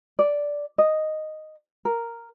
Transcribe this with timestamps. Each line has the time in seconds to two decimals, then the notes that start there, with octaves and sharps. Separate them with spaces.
0.19 D5
0.78 D#5
1.85 A#4